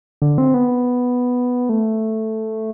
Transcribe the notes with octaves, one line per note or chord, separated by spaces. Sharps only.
D3
C4
B3
A3